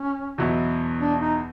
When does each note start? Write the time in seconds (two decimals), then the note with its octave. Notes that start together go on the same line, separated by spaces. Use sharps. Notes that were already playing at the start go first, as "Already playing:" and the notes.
Already playing: C#4
0.38 E2 B2 F#3 B3 E4
1.00 D4
1.20 D#4